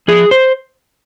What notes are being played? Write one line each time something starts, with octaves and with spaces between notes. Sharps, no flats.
F3 G#4
C5